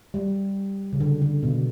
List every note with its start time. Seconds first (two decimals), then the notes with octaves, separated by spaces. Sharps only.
0.14 G3
0.93 C#3
1.00 D3
1.22 D3
1.43 B2